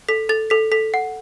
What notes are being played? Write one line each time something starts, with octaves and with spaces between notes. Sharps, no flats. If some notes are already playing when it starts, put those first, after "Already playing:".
A4 B6
A4 A6
A4 B6
A4 B6
F#5